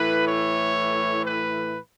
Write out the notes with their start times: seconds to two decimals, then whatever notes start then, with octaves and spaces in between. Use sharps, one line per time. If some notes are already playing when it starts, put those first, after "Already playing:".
Already playing: A2 E3 A3 B4
0.26 C#5
1.26 B4